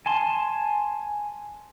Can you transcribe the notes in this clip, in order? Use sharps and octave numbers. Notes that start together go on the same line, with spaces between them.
G#5 A5 C6